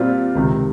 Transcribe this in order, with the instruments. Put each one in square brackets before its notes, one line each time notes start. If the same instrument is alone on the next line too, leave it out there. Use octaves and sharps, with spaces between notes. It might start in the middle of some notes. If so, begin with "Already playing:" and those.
Already playing: [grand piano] A#2 G3 C4 F4
C#2 C3 D#3